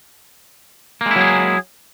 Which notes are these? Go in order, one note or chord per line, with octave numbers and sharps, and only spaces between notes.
F#3 G#3 A#3 E4 G#4